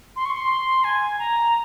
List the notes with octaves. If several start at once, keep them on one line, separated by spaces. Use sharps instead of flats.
C6
C#6
C6
G#5
A#5